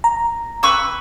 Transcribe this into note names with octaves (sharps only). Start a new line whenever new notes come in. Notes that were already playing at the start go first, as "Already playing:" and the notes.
A#5
B4 C#6 E6